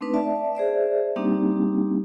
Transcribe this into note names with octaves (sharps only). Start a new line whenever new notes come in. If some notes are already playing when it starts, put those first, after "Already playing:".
A3 C4 D4 D#4 B4
D5 E5 A5
G#4 C5 D5 E5
G3 A#3 C4 D4 D#4 G4